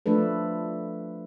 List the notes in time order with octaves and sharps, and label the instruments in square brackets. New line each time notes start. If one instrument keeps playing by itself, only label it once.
[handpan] F3 A3 D4 A4 B4